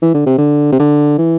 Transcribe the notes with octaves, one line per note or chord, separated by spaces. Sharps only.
E3
D3
C3
D3
C3
D3
E3